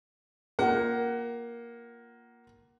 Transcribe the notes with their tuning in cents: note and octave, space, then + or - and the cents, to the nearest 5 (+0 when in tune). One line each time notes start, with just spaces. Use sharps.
A#3 +10 F4 +10 F#5 +25